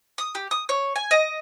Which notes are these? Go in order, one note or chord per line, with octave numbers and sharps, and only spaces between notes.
D#6
G4
D#6
C#5
G#5
D#5